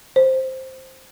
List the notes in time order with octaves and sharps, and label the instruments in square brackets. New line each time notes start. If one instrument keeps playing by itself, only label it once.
[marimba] C5